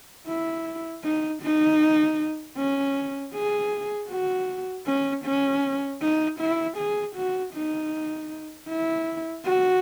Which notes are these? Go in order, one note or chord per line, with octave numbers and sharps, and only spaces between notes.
E4
D#4
D#4
C#4
G#4
F#4
C#4
C#4
D#4
E4
G#4
F#4
D#4
E4
F#4